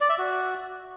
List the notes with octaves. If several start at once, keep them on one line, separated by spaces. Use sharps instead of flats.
D5
E5
F#4